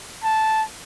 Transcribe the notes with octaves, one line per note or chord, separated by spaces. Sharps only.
A5